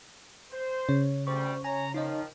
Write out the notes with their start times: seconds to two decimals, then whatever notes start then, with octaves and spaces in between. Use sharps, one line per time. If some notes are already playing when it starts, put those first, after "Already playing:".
0.51 C5
0.89 C#3 C#5
1.27 D2 G3 C5 C#6
1.64 C#5 G#5 A#5
1.94 D#3 F3 D#4 C#5 D#5